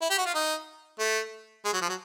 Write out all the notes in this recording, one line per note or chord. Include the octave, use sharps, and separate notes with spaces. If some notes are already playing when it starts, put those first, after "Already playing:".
E4
G4
F#4
F4
D#4
A3
G#3
F#3
F3
F#3